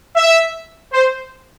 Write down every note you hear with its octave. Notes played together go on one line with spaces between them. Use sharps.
E5
C5